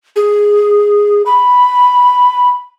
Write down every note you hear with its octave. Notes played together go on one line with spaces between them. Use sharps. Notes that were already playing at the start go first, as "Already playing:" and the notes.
G#4
B5